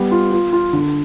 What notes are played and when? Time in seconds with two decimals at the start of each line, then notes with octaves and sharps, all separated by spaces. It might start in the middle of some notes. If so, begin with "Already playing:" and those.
Already playing: G3 B3
0.11 F4
0.32 F4
0.53 F4
0.73 D3